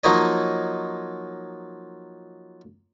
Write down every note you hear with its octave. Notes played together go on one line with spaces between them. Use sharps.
F3 F#3 A#3 D#4 C#5 D#5